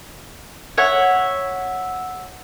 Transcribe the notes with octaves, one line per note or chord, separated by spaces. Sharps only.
C#5 E5 F#5